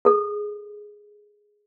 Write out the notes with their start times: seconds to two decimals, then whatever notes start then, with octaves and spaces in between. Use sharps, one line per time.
0.05 G#4 A4